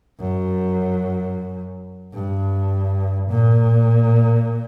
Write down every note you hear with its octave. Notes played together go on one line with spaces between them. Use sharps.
F#2
G2
A#2